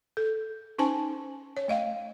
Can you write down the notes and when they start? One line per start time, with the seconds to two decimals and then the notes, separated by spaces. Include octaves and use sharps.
0.17 A4
0.79 C#4 D#4 C5 G#5 A5
1.57 C#5
1.68 A3 D#5 F5 G5